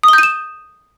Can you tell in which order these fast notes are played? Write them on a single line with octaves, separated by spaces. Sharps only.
D#6 G7 G6 D#7 E7